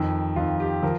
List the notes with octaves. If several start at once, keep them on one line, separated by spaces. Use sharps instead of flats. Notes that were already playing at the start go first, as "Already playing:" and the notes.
Already playing: F2 D#3
F2 D#3 F4
G4
F3 A#4